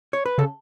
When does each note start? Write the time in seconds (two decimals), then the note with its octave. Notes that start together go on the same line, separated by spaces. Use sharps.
0.13 C#5
0.26 B4
0.38 C#3 A4